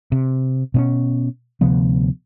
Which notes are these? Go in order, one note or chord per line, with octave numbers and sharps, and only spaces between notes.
C3
B2 C4 C#4
D2 C3 F3 B3